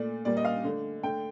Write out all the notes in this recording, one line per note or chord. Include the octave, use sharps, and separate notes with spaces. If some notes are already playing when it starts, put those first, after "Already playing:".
Already playing: A#2 A3 D5
A#2 G3 A#3 D5
D#5
F5
D3 A3
D3 A3 G5